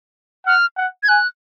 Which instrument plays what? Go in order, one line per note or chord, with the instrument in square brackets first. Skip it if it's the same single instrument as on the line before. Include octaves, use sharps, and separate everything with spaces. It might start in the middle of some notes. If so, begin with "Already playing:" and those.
[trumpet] F#5 [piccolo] F6
[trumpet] F#5
[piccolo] G#6
[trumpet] G#5 [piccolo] F#6